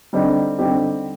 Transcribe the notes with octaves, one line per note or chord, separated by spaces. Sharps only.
D3 G3 C4 D#4 G4
D3 G3 C4 D#4 G4